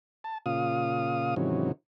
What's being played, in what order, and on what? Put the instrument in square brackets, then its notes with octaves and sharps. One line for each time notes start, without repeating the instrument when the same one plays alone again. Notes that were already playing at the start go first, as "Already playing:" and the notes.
[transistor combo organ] A5
A#2 C#3 F4 F5 D#6
G#2 C3 D#3 E3 F#3 C#4